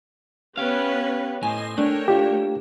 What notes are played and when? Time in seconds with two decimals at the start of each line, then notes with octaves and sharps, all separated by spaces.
0.57 B3 C#4 G4 B4 F5
1.43 A2 C5 D#5 G#5
1.78 A3 D4 A#4 C#5 G5
2.08 F4 G4